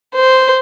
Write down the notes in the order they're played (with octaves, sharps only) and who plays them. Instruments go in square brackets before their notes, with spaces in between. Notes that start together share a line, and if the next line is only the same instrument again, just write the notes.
[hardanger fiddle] C5